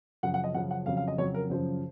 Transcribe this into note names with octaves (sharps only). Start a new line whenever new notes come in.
F#2 C#3 F3 F#5
F#5
D#5
F#2 C#3 F3 F#5
F#5
F2 C#3 F#3 F5
F5
D#5
F2 C#3 F#3 C#5
A#4
F#2 C#3 F3 C5